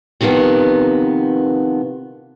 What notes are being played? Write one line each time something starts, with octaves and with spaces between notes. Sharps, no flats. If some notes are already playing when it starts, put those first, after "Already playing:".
C3 D#3 F3 A#3 B3